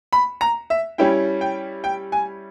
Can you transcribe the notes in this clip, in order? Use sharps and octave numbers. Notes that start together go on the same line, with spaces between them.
B5
A#5
E5
G3 C#4 E4 G5
G5
G5
G#5